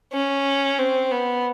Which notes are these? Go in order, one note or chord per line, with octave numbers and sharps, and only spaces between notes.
C#4
C4
B3